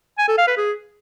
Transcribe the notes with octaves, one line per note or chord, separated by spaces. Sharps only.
G#5
A4
F5
B4
G#4